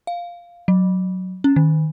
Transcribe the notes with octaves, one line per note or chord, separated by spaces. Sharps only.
F5
F#3
C#4
D#3